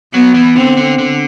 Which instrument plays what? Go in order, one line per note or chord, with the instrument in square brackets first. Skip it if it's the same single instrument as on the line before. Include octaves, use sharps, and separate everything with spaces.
[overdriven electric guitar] F#3 [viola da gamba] B3
[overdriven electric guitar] E3
[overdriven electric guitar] D3 [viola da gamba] C4
[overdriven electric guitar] D3
D3